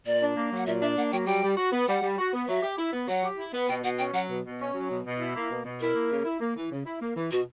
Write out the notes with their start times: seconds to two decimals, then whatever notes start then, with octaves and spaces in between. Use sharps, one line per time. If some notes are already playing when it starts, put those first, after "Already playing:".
0.06 A#2 D5
0.21 D4
0.36 A#3
0.52 F#3 F#5
0.66 A#2 E5
0.81 D4 E5
0.97 A#3 F#5
1.12 F#3 G5
1.26 G3 G5
1.43 G3
1.57 F#4
1.72 B3
1.88 G3 F#5
2.02 G3
2.18 F#4
2.33 B3
2.48 F#3 E5
2.62 G4
2.77 E4
2.92 B3
3.08 F#3 F#5
3.24 G4
3.38 E4
3.53 B3
3.68 B2 G5
3.84 B2 F#5
3.98 C#4 G5
4.14 F#3 F#5
4.29 B2
4.43 B2
4.59 C#4
4.74 F#3
4.90 B2
5.04 B2
5.19 E4
5.35 A#3
5.50 B2
5.65 B2
5.80 E4 A#4
5.94 A#3
6.10 C#3
6.25 E4
6.40 A#3
6.56 E3
6.71 C#3
6.85 E4
7.00 A#3
7.16 E3
7.31 B2 F#4